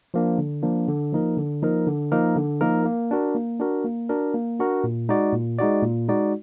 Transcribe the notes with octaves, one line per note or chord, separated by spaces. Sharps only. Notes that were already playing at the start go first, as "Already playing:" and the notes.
F3 A#3 D4
D3
F3 A#3 D4
D3
F3 A#3 D#4 A#4
D3
F3 A#3 D#4 A#4
D3
F3 A#3 D#4 A#4
D3
F3 A#3 D#4 A#4
A#3
D4 F#4 A#4
A#3
D4 F#4 A#4
A#3
D4 F#4 A#4
A#3
D4 F#4 A#4
A#2
G#3 D#4 F#4 D5
A#2
G#3 D#4 F#4 D5
A#2
G#3 D#4 F#4 D5